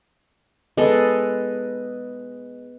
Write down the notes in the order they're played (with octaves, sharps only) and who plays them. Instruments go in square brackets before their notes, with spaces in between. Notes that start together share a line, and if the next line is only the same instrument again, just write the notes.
[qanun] G#3 A4 [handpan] B3 B4 D#5